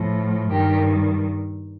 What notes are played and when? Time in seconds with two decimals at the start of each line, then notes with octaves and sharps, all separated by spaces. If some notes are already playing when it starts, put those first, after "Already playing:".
Already playing: A2 F3
0.50 G2 D#3 G3 G4 A#4